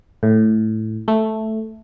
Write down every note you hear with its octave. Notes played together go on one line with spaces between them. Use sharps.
A2
A3